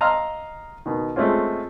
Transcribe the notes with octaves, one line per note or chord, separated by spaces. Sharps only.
D#5 F5 A#5 C6 E6 F6
B2 D#3
G#3 A3 C4 C#4 F4